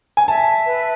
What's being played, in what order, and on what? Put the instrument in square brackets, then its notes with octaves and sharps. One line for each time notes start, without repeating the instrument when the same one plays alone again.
[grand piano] G#5
[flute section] E5 [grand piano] A5
[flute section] B4